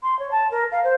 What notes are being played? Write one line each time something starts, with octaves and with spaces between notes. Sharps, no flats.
C6
C#5
A5
A#4
F5
C5